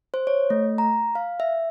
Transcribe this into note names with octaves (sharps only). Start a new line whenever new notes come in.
C5
C#5
A3
A#5
F5
E5